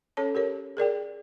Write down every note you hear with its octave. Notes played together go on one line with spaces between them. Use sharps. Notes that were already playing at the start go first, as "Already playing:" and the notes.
C#4 A4 C#5 A5
G4 A#4 C#5
G#4 A#4 D5 G5